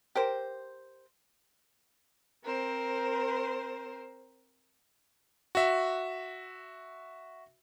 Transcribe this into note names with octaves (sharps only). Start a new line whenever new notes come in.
G4 A#4 C5
C4 A#4 C5
F#4 E5